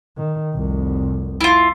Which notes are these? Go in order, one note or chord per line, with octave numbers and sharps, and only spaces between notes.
D#3
F1 C2
E4 F4